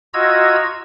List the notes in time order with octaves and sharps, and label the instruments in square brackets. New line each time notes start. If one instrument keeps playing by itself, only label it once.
[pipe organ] F4 F#4 D#5 A#5 E6 G#6